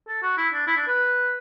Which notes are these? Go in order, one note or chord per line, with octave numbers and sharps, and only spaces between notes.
A4
F#4
E4
D4
E4
D4
B4